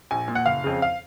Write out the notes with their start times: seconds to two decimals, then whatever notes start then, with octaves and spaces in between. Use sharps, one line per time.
0.11 A#1 G#5
0.28 A#2
0.35 F#5
0.46 F#1 F5
0.64 F2 C#3
0.82 F5